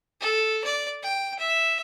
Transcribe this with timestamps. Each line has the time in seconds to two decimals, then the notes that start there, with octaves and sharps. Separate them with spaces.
0.20 A4
0.64 D5
1.03 G5
1.39 E5